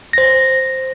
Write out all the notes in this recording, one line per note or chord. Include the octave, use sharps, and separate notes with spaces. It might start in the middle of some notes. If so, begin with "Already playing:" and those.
C5 A#6